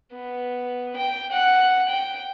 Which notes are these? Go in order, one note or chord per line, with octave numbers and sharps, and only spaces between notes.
B3
G5
F#5
G5